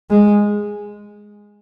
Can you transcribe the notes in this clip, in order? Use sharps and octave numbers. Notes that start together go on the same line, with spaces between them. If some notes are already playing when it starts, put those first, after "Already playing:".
G#3